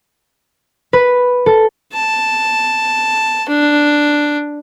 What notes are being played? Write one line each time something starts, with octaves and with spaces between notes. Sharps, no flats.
B4
A4
A5
D4